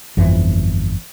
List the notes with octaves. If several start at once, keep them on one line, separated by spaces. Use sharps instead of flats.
G1 F2 E3